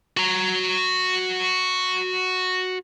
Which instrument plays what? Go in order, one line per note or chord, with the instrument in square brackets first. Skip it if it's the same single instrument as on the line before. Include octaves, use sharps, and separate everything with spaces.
[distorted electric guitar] F#4 A#5